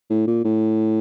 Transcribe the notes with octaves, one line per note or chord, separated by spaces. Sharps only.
A2
A#2
A2